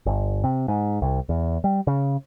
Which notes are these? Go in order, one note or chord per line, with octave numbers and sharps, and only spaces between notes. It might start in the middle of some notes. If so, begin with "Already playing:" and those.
G1
C3
G#2
C2
E2
G3
C#3